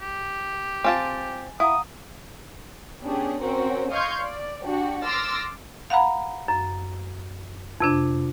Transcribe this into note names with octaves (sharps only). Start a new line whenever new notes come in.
G4
C4 F4 G#5 A5 A6
E4 F5 F#5 A#5 D#6
B3 C#4 D4 G4 G#4
C4 C#4 F#4 A#4 C5 G5
D#5 F5 C6 C#6 G6 G#6
D5
D4 F#4 G4
C6 D6 E6 F6 A6 A#6
F5 F#5 A#5 B5
F#2
F2 C3 D4